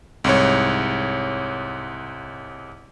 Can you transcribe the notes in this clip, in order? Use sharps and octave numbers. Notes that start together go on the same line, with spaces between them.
C2 G#2 C#5